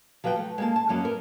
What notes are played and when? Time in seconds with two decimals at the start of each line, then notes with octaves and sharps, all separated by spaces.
0.24 F3 F#3 B4 C#5 G5
0.36 A3
0.58 G#3 A#3 A5
0.76 A5
0.89 F#2 F#3 A#3 D#5
1.05 B3 A#4